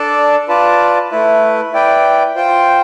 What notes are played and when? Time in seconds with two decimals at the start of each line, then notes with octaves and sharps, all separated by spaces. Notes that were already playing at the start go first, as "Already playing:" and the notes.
Already playing: D4 A4 D5 A5
0.48 F4 B4 D5 A5
1.11 A3 E4 B4
1.73 E4 B4 D5 G5
2.35 F4 C5 G5